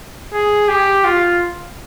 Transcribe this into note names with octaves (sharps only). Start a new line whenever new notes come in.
G#4
G4
F4